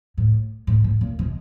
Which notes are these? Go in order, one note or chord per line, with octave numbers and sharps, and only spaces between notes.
A2
A2
A2
A#2
B2